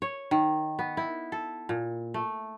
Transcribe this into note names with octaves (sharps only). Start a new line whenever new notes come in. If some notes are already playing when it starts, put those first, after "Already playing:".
C#5
D#3
B3
E4
A4
A#2
A3